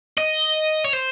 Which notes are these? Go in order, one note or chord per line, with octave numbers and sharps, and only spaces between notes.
D#5
C#5
C5